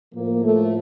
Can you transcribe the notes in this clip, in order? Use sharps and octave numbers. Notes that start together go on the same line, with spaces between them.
A2 F3 A#3
A3